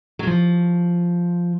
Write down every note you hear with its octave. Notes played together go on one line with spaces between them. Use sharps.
F#3
F3